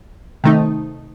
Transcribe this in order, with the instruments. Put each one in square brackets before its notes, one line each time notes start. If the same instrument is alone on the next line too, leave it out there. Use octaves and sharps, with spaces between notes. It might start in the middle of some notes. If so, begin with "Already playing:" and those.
[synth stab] C3 D#3 A3 D#4